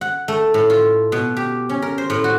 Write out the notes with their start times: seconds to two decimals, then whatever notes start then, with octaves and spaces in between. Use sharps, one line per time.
0.01 F#5
0.28 A3
0.54 A2
0.70 F4
1.12 B2
1.37 G4
1.69 C#4
1.82 A#4
1.98 C5
2.10 A2
2.24 F#4